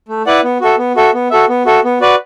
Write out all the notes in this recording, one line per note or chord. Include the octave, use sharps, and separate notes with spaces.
A3
E4 B4 D5 F#5
B3
F#4 A4 E5
B3
F#4 A4 E5
B3
F#4 A4 E5
B3
F#4 A4 E5
B3
F#4 B4 D5